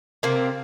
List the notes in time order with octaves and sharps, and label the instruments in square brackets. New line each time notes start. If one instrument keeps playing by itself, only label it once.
[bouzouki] C3 A#3 C4